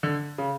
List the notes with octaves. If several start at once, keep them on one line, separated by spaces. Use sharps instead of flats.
D3
C#3